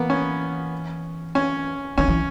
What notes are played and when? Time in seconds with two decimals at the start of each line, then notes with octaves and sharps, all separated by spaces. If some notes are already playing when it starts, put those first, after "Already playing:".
Already playing: E3 A#3 B3
0.10 C#4
1.35 C#4
1.98 D#3 C#4
2.08 E3